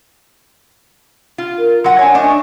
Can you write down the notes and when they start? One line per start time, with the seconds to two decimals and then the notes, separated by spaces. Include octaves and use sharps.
1.38 F4
1.59 A#4
1.84 F#3 F#5 C6
1.99 D4 C#5 G#5
2.14 A3 D4 D#5
2.28 C#6